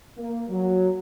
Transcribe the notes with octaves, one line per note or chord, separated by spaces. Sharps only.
A#3
F#3